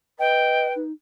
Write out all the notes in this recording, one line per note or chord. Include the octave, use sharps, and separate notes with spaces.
B4 D#5 G5
D#4